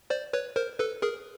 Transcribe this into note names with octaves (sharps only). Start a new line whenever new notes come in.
C5 D5
B4 C#5
A#4 C5
A4 B4
G#4 A#4